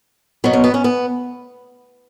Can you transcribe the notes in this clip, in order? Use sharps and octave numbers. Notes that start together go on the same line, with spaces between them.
B2 F#3 B3
C#4
B3
C#4
B3